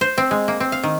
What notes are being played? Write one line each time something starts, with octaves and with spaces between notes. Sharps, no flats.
C5
C4
G#3
A#3
C4
F5
D#3